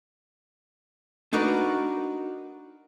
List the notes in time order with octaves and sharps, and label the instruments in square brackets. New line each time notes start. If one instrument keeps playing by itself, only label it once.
[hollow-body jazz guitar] D4 D#4 F#4 A#4 B4